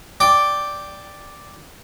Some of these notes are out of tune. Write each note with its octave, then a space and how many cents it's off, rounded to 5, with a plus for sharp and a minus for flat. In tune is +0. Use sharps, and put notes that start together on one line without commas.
D5 +0 G5 +0